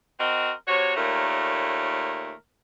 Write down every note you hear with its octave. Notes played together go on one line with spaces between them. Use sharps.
C4 F#4 A#4 D#5
C3 F#4 C#5
D#2 A#2 A3 A#4 C#5